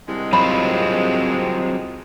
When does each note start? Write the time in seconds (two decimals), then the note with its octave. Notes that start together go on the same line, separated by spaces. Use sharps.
0.08 C2 D3 D#3 G#3
0.33 F#3 C4 F4 B5